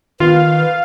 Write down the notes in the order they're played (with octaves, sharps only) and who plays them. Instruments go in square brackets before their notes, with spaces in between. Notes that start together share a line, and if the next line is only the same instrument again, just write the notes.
[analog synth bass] D#3 [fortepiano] F4 [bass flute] B4 [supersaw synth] F5